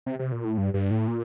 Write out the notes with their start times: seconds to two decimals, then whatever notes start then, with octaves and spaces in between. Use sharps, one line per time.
0.06 C3
0.19 C3
0.32 A#2
0.44 A2
0.57 G2
0.74 G2
0.91 A2
1.08 A#2